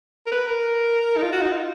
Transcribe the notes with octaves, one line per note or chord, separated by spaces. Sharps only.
A#4
B4
A#4
D#4
F4
F#4
D#4
F4